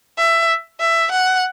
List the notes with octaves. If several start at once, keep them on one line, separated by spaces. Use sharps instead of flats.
E5
E5
F#5